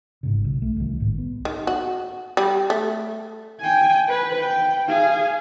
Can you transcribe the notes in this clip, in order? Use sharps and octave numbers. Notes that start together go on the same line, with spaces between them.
G#1 G#2 C#3
B1
A3
C2 D#3
G#1 A2
B3
D#3
F#4
G3
A3
G5 G#5
B4
G5
G#4 F5